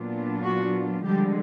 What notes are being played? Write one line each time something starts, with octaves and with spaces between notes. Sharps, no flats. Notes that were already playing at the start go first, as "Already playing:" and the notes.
Already playing: A#2 F#3 B3 D4 F4
F#4
D3 F3 G3 G#3 G4